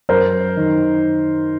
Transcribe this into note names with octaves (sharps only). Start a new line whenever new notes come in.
F#2 A#4 C5
D#3